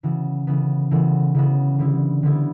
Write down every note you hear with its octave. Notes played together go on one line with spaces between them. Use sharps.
C#3 E3 B3 F#4
C#3 E3 B3 F#4
C#3 E3 B3 F#4
C#3 E3 B3 F#4
D3 G3 B3 E4
D3 G3 B3 E4